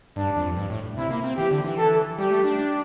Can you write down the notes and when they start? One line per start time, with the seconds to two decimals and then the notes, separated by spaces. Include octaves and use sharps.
0.16 G2 D4
0.36 F2
0.57 G2
0.70 A2
0.97 C3 E4
1.10 A#3
1.24 C4
1.37 E3 G4
1.51 D3
1.65 E3
1.78 A4
2.18 G3 G4
2.31 A3
2.44 D4